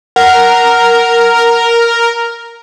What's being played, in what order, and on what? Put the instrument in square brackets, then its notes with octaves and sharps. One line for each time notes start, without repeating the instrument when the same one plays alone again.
[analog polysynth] A#4 [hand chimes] F#5